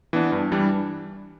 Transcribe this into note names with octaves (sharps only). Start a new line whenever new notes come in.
E3 B3 D4
G2
E3 G3 D4